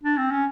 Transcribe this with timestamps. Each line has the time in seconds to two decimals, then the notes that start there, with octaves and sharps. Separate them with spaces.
0.03 D4
0.17 C4
0.31 C#4